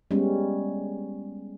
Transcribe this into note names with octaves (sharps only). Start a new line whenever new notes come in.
G3 G#3 B3 C#4